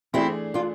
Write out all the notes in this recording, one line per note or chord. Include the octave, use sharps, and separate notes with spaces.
E3 A3 C4 D4 E4 G#4 D5
D4 F4